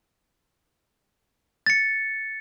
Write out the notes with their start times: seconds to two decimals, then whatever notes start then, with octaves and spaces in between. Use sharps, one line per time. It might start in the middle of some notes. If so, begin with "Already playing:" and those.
1.66 A6 C#7